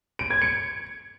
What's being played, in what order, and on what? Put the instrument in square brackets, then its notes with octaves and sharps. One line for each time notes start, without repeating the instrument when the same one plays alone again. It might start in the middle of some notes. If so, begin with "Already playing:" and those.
[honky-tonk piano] D7
G#6
C#7